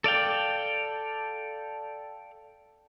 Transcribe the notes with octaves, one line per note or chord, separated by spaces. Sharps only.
A4 D5 F5 G5